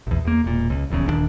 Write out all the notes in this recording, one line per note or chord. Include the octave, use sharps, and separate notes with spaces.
A#1 E2
E2 A#3
E1 A#2
C#2
D#1 A#1 E2 C#3
D#1 D#2 D#3 D4